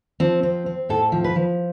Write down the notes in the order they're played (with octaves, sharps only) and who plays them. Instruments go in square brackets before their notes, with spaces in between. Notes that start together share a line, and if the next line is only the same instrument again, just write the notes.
[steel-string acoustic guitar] F3 C4
C4
C4
A2 A4
F3
B4
F3